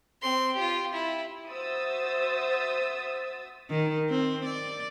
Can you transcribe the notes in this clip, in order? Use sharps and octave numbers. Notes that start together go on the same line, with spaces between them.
C4 C6
F4 G4
E4
F#4 C5 E5 D#6 E6 A6
D#3
C4
D5